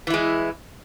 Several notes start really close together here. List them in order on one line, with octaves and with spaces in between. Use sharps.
E3 E4 G#3